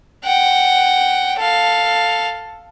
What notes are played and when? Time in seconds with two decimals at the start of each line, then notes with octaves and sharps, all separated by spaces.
0.24 F#5 G5
1.39 A4 F5